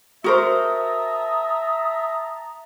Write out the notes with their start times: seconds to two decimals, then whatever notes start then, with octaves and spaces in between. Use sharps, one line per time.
0.24 F#4 A#4 C5 E5 A5 A#5 D#6